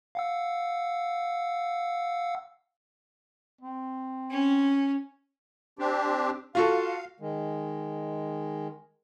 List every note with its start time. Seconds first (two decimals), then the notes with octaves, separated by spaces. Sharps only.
0.15 F5 F#5 E6
3.61 C4
4.30 C#4
5.79 C4 D4 G4
6.55 F4 F#4 A4 F5
7.20 D#3 G#3